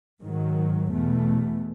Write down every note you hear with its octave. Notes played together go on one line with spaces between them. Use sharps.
G#2 D#3 F#3
E2 B2 A3